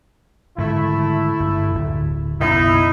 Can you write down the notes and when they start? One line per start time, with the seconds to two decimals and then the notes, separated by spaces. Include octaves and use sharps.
0.58 G#2 D3 D#3 A3 E4
1.40 G1
1.75 D1
2.40 F#1 B1 F#2 D#4 E4